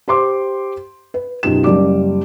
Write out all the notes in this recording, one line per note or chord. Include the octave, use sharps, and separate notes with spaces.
G4 C5 C6 D6
B4
B1 F#2 D#4 F4 G4 E7
F#1 G3 D5 D6